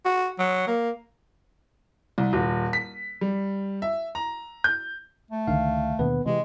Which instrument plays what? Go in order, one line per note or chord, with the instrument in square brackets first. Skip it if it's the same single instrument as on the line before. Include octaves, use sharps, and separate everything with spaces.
[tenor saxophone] F#4
F#3
A#3
[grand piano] C2
D#1
B6
G3
E5
A#5
G6
[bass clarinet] A3
[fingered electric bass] C#2 D3 D#3 [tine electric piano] F5
[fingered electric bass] D#2 B2 D3 [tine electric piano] B3 B4
[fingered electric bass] C3 [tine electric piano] E3 G4 [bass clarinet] G#3